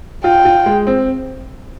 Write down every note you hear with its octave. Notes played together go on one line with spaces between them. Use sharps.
F4 G5
F4
G#3
C4